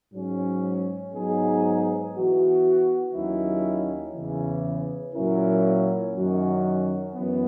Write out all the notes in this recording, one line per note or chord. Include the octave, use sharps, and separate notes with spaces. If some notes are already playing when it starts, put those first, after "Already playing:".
G#2 F#3 C#4
G#2 F#3 B3 D#4 G#4
E3 B3 F#4
D#2 D#3 F#3 C#4 E4
E2 C#3 E3
A#2 F#3 C#4 E4 A#4
F#2 D#3 F#3 C#4 F#4
F#2 E3 B3